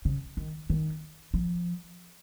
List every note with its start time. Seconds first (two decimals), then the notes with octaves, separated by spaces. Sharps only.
0.05 C#3
0.37 D#3
0.70 D#3
1.34 F3